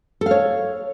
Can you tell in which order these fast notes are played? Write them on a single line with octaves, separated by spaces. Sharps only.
A4 F5 C#5